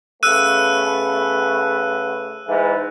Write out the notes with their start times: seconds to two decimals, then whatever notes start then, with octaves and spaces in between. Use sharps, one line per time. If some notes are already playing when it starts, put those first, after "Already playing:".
0.23 C#3 A3 B3 E6 F#6 D#7
2.46 G#2 E3